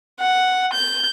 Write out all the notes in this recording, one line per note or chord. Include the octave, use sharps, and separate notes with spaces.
F#5
G6